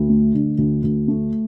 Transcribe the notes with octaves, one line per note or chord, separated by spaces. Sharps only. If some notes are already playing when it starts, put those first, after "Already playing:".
Already playing: D2
A3
D3
D2
D2
A3